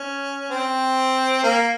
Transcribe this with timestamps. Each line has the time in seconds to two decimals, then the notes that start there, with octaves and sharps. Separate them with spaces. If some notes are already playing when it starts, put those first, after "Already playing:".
Already playing: C#4
0.51 C4
1.44 A#3